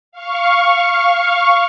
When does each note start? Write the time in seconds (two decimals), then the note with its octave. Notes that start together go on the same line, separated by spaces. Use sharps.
0.12 F5 C#6